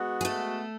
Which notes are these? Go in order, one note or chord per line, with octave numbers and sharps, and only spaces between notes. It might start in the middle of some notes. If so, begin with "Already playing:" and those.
Already playing: G#3 B3 F#4
G#4
A3 A4